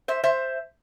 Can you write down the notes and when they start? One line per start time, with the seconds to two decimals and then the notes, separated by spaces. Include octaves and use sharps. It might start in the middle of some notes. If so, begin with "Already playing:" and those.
0.08 C5 E5
0.24 C5 E5